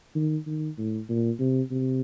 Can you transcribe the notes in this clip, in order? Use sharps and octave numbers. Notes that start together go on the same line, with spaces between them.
D#3
D#3
A2
A#2
C3
C3